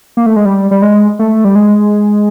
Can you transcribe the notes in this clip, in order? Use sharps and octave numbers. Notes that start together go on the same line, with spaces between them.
A#3
A3
G#3
G3
G3
G#3
A3
G3
G#3